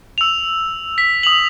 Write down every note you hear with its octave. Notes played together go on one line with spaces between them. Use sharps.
E6 F7
B6
D#6 F7 F#7